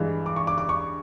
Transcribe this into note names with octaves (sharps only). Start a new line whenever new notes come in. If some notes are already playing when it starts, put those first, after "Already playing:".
Already playing: G2 E3 G#3
D6
C#6
D6
D6
C#6